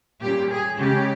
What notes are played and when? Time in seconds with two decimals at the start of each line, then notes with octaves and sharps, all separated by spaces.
0.22 A#2 G3 C#4 G4
0.51 G#4
0.79 C#3 G#3 C#4 G4